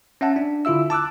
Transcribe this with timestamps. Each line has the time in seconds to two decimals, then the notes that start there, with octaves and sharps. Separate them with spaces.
0.21 C#4 E5 F#5 A5
0.36 D4
0.65 D3 E4 F4 E5 E6
0.90 A5 D6 E6 F#6